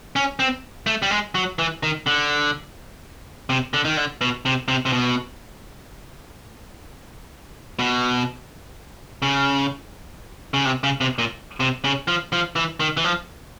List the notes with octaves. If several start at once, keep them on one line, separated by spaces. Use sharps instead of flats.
C#4
C4
A3
G3
G#3
F#3
E3
D#3
D3
C3
D3
D#3
D3
B2
C3
C3
C3
B2
B2
C#3
C#3
C3
C#3
C3
A#2
C3
C#3
F3
F3
E3
D#3
E3
F3